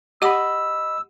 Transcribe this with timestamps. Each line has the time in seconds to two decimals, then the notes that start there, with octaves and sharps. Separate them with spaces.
0.22 G4 D#5 F#5 B5 D6 E6